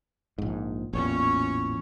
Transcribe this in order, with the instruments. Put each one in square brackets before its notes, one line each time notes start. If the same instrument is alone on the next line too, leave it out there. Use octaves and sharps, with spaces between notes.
[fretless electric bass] A#1 G#2
[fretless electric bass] A1 E2 A#2 [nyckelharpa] C#4 C#5